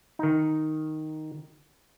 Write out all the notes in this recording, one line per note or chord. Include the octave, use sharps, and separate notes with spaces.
D#3 D#4